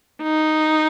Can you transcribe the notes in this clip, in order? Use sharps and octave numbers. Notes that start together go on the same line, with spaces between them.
D#4